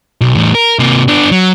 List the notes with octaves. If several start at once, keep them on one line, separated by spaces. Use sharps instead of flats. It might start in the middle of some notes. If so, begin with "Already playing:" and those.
B1
E2 A2
A#4
C3 A#3
B3 D4
F#3